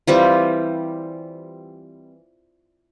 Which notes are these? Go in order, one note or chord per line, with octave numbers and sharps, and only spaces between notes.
E3 G3 C4 F4